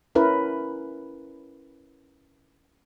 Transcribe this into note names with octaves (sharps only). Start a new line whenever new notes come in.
C#4 E4 A#4 B4